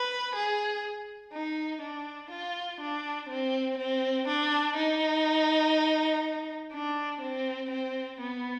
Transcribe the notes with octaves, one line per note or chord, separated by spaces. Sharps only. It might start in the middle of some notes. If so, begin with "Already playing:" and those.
Already playing: B4
G#4
D#4
D4
F4
D4
C4
C4
D4
D#4
D4
C4
C4
B3